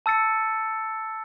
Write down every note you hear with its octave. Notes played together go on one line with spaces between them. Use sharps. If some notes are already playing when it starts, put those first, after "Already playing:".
A5 E6 A6 C#7